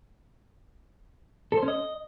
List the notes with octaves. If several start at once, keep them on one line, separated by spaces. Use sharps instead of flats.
A4
C5
C#4
D#5